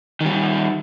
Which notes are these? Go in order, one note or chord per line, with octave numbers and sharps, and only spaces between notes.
D#3 G3